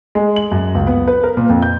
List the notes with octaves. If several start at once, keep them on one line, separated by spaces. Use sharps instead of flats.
G#3
F#7
F#2
C#2
B3
B4
A#4
A#2
F2
G6